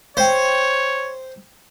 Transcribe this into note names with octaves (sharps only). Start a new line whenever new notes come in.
C5 C#5 F5 G5